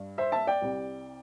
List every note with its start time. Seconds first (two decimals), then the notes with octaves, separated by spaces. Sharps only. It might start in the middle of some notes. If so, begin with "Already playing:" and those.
Already playing: G2 G3
0.18 C5 E5
0.32 E5 A5
0.47 D5 G5
0.62 C2 C3 G3